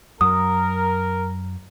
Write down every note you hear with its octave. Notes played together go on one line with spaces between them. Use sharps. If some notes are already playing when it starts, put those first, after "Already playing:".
F#2 F#3 A#4 D#6